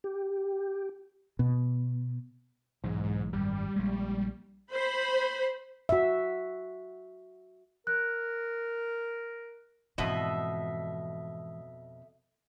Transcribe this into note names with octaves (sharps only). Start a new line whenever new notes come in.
G4
B2
B1 G#2 E3 G#3
G#2
G#1 F#2 G3
A#1 G#3
C5 B5
F#4 E5
A#4 F#6
F2 G#2 B2 E3 D#5 E5